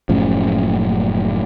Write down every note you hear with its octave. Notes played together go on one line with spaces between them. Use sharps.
F#1 A2 C#3 F3